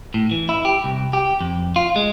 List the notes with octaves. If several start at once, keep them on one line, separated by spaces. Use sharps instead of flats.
A2
E3
E4
G4
C2
G4
F2
F4
G#3